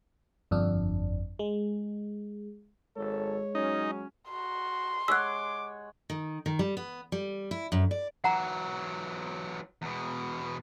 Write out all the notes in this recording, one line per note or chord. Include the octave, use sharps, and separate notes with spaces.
G1 F2 D4
G#3
G#1 G#3 A4 C#5
F#3 C#4 D#4
F#4 C6
G#3 C#5 F#5 D6 E6 F#6
D#3
D#3
G3
B3
G3
E4
F#2
D5
E3 F#3 F#5 A#5
E2 B2